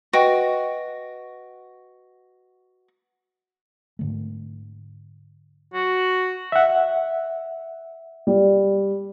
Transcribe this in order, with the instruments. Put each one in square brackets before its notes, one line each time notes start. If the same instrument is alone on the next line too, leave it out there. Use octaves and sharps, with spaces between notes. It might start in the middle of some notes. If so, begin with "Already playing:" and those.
[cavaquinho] F#4 [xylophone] B4 D#5 G5
[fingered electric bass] G#2 D3 A3
[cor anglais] F#4
[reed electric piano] E5 F#5
[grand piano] G3